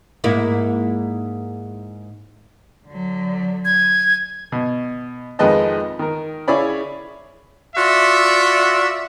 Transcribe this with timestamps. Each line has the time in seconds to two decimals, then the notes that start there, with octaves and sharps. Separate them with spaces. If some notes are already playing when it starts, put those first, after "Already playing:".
0.24 G#2 A#3 E4
2.88 D3 F#3
3.65 G#6
4.52 B2
5.39 F2 D#3 G#3 B4 D#5 A5
5.99 D#3 A#4
6.48 C#3 E4 G#4 C#5 D5 B5
7.76 F4 F#4 D5 E5